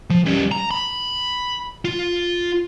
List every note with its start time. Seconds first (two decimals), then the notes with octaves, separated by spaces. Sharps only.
0.10 F3
0.26 G3 C#4
0.52 A#5
0.71 B5
1.85 F4